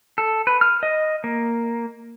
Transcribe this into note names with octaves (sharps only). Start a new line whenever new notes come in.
A4
B4
F6
D#5
A#3